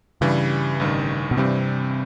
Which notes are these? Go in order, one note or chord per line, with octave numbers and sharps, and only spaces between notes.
G2 C#3 E3 G3
A1 G2 D#3
B2
G2 C3 E3 G3 C4